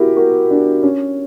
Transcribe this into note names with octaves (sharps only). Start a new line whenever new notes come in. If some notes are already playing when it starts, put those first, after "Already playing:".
Already playing: E4 F#4 G4 A#4
F#4 A#4
D4
C#4